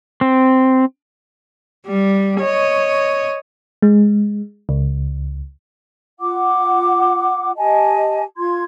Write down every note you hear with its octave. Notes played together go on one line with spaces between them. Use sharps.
C4
G3
C#5 D#5
G#3
C#2
F4 F#5 D6
G4 D#5 G#5 A5
F4 C6 G#6